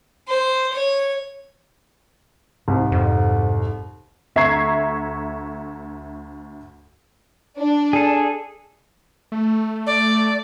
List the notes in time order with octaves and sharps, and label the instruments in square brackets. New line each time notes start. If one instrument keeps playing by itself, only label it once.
[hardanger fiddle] C5
C#5
[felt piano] C2 [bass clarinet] G#2
[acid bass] F2
[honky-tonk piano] D2 E5 A#5 C#6 G#6 C7
[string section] D4
[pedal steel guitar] G#4 A4
[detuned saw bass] A3
[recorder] D5